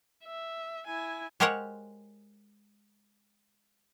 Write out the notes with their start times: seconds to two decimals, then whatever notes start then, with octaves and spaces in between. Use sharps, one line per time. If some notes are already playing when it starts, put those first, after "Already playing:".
0.24 E5
0.87 E4 G#5
1.40 G#3 G4 A#4 C5 C#5 F#5